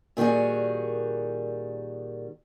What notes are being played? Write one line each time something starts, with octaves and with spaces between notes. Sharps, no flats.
A#2 D#3 G3 F#4 G#4